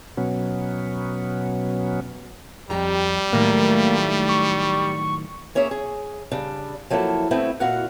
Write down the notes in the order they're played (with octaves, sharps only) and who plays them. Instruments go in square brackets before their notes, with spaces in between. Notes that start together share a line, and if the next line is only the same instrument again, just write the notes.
[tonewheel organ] B2 F#3 B3 C#4
[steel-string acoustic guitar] F2 G4 A#5 [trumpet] G3
[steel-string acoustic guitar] A2 D#3 F#3 [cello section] A3 [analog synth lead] A#3
[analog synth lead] C#6
[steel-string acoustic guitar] A#3 C#4 G#4 C#5 E5
G#4
C#3 G3 D4
F3 F#3 A#3 E4 A4
A3 B3 C4 E4
A#2 E4 F#4 F5 F#5